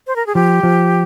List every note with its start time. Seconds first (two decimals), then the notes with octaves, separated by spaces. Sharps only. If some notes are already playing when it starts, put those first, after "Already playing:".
0.07 C5
0.16 A#4
0.27 G#4
0.35 F3 G4
0.63 F3